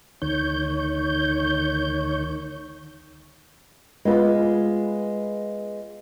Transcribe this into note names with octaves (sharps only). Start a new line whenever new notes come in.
D2 D#3 C#5 G6
G#3 B3 F4 B4